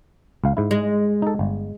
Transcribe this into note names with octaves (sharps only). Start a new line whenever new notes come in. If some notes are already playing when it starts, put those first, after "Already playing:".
C#2 F5
G#2 E4
G#3
D#4 A4
G1